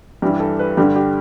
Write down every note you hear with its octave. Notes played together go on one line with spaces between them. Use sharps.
G2 E3 G3 G4
A4
B4
G2 D3 G3 G4
G4